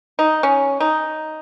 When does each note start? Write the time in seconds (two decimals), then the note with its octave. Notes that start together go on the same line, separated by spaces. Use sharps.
0.19 D#4
0.43 C#4
0.80 D#4